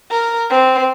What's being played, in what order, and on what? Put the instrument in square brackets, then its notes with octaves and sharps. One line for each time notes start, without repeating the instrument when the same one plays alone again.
[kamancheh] A#4
C4